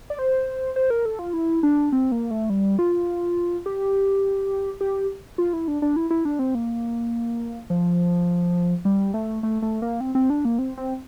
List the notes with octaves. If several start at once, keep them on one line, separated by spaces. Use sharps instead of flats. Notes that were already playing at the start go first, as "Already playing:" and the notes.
D5
C5
C5
A#4
A4
F4
E4
D4
C4
A#3
A3
G3
F4
G4
G4
F4
E4
D4
D4
E4
E4
D4
C4
A#3
F3
G3
A3
A3
A3
A#3
C4
C4
D4
A#3
C4
C4